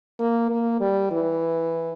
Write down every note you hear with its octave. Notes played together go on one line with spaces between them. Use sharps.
A#3
A#3
G3
E3